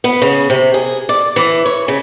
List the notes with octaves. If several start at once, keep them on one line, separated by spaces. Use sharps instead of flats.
B3
C#3
C3
G#4
D5
E3
C#5
C#3